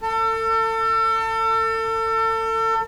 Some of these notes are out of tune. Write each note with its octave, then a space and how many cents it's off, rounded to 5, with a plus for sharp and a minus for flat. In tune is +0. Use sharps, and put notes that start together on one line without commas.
A4 +35